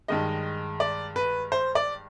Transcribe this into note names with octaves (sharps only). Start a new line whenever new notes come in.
G2 D#3 G#3 D#5
D5
B4
C5
D5